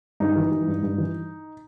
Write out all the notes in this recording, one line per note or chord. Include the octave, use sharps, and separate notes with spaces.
G2 D#4
E3
E3
G2
G2
E3